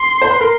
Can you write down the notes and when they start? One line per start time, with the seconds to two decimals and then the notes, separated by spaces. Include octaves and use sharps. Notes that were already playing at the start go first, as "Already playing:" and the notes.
Already playing: C6
0.22 C5
0.30 B4
0.41 A#4